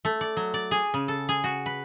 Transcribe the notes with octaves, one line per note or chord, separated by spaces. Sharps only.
A3
D5
F#3
D5
G#4
C#3
A4
G#4
F#4
B4